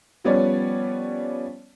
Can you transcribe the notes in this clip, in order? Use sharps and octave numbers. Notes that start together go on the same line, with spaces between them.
F3 G3 B3 C#4 C#5 D5